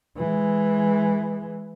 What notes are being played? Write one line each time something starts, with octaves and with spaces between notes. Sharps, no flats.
E3 G#3